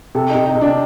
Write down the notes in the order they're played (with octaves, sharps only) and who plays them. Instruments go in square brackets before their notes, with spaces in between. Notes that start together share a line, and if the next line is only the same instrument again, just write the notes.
[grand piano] C3 [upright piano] A4
[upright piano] D#4
[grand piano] C3
[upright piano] D#4
[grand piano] C3
[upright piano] D4